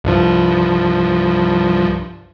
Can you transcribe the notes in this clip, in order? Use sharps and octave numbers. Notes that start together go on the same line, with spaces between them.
C2 G2 F3